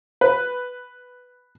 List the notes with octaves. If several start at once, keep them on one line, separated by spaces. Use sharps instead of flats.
B4